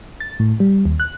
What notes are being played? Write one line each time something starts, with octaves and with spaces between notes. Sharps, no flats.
A6
A2
G3
D#2
F#6